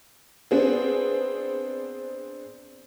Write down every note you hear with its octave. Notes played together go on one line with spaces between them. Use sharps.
B3 C4 D4 G#4